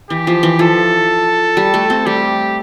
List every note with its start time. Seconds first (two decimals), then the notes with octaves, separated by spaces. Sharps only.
0.10 E3 G4
0.27 F3
0.43 E3
0.59 F3 A4
1.57 G3
1.74 A3
1.90 C4
2.06 G3 G4